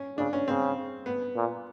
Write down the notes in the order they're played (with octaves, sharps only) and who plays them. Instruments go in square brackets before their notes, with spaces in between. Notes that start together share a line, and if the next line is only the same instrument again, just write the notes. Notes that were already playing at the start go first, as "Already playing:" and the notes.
Already playing: [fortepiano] C#4
[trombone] C#3 [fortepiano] D4
[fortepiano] C#4
[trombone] C#3 [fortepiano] C4
[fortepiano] B3
[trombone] A#2